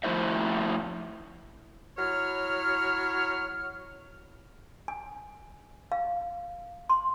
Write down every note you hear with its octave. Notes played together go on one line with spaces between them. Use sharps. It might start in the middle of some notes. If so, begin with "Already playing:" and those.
F3 A3 E4 C5 E5
F#3 E4 C#5 F6
G#5
F5
C6